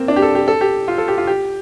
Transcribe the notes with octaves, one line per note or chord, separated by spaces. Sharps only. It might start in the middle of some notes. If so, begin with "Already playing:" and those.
Already playing: A#3 C4
D4
G4
A4
G4
A4
G4
F4
A4
G4
F4
G4